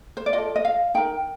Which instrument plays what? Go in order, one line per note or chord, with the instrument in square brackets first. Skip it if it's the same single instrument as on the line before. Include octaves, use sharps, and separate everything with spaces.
[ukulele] C5
D5
F4 A4 D#5
D#5
F5
D#4 A#4 G5